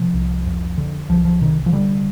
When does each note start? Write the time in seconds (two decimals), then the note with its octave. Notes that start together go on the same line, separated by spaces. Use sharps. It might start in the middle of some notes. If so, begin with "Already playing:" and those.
Already playing: C3 F3
0.14 C2
0.46 F2
0.78 D3
1.09 C2 F3
1.25 F3
1.41 C3 D#3
1.66 F3
1.73 D3 G3